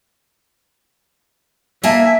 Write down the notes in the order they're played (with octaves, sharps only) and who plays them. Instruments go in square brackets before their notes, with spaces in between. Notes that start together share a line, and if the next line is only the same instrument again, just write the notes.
[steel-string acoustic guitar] A#3 G#5 A5 [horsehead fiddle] E5